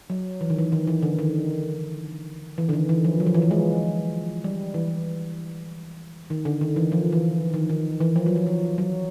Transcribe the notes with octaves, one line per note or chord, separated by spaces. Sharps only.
F#3
E3
D#3
E3
D#3
E3
D3
D#3
E3
D3
D#3
E3
F3
F#3
F3
E3
F3
G#3
G3
E3
D#3
D3
D#3
E3
F3
E3
D#3
D#3
E3
F3
F#3
F3
F3
F#3